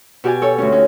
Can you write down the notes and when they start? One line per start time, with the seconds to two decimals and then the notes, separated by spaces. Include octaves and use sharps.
0.24 B2 F#4 G4 D5 G#5
0.42 A4 C#5
0.58 D2 C#4
0.72 C#4 D#4